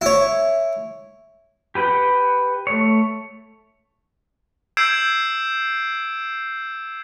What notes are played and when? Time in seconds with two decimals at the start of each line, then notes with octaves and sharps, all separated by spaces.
0.01 E4 C#5
1.75 G4 B4 F#5 G5
2.67 A3 C#5
4.77 E6 G6 G#6 C7 D7 E7